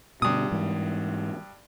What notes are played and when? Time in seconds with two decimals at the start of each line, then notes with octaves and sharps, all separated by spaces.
0.22 G2 B2 D3 D#6
0.51 G#2 E3